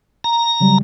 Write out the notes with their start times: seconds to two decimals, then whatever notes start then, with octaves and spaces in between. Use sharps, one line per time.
0.24 A#5
0.60 C#3 F#3 G3